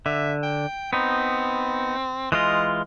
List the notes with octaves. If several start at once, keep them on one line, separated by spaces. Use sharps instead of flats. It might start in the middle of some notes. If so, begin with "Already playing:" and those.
D3 E5
G5
B3 C4 D#4
E3 G#3 F4 D#5